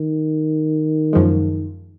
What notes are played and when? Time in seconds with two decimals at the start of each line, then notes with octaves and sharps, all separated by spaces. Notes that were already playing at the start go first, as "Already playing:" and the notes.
Already playing: D#3
1.13 F#2 F3 G#3